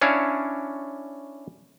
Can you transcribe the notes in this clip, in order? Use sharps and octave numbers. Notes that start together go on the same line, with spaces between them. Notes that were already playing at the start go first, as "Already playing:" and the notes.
C#4 D4 E4 C#5 F5